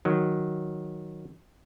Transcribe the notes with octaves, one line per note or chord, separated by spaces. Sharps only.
D#3 F#3